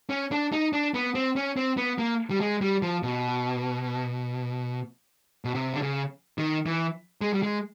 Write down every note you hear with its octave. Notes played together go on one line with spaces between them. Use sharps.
C#4
D4
D#4
D4
B3
C4
C#4
C4
B3
A#3
G3
G#3
G3
F3
B2
B2
C3
D3
C#3
D#3
E3
G#3
G3
G#3